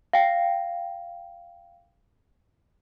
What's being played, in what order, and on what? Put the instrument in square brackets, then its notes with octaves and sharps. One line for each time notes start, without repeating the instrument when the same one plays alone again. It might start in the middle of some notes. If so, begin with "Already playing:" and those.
[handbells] F5 G5